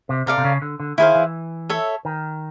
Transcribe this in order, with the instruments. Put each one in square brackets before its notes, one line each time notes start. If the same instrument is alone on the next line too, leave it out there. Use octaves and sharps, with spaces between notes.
[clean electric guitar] C3
[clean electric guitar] C3 [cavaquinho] A4 D5 F5 A#5
[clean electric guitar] C3
C#3
D3
D3
[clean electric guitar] D#3 [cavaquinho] E4 G#4 C5 F5
[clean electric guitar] E3
[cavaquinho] A4 C#5 E5
[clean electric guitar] D#3